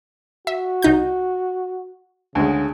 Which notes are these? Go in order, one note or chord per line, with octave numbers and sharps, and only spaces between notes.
F#4 E5
C2 D#4 G6
D2 C#3 G#3